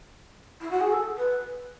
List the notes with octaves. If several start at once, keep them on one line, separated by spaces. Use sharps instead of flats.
E4
F#4
G#4
A4
B4